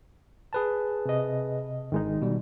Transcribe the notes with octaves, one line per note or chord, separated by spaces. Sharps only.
G#4 B4 A5
C3 D#5
G#1 D#3 G#3 D#4
B2 G3